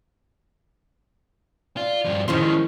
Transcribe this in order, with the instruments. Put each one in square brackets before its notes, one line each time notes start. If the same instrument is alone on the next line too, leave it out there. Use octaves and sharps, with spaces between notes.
[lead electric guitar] F4 [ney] D5
[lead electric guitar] G2 F3
[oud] D#3 C#4 C5 [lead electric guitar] F3 G#3 [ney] E4